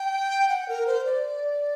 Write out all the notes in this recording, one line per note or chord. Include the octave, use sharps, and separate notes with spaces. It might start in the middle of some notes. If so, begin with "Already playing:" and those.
Already playing: G5
F#5
A#4
C5
D5